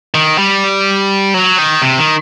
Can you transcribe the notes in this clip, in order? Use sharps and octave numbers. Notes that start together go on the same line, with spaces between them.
D#3
G3
F#3
D#3
C3
D#3